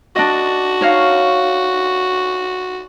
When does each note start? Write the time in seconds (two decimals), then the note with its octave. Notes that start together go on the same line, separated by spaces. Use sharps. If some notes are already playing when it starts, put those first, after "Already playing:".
0.16 D4 F#4 D#5
0.81 D#4 C#5 F5